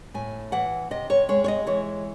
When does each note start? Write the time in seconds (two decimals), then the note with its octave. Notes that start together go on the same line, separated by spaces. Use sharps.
0.14 A2 G#5
0.52 E3 F#5
0.91 C3 D#5
1.10 C#5
1.29 G#3 C#5
1.44 C#5
1.48 D#5
1.67 E3 C#5